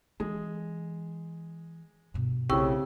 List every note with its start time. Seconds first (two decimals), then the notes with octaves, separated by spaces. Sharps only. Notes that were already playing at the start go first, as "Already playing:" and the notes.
0.20 E3 G#3
2.14 G2 B2
2.50 B1 A2 C#3 C4 G4 G5 C#6 E6